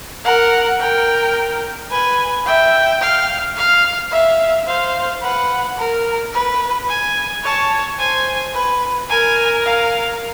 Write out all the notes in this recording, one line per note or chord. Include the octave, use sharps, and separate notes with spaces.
A#4 F#5
A#4 G5
B4 G#5
E5 G5
F5
F5
E5 F5
C5 F5
B4 F#5
A#4
B4
G#5
C#5 A5
C5 G#5
B4
A#4 G#5
F5